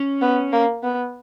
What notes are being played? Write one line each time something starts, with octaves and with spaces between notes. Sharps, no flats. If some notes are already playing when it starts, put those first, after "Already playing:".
Already playing: C#4
B3
A#3
B3